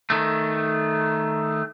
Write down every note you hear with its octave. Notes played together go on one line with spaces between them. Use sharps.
D#3 A3